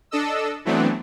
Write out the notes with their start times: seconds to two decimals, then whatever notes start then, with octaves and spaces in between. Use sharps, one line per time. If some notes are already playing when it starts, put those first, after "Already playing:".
0.11 D4 A4 D#5 E6
0.65 E3 F#3 A3 B3 C4 D4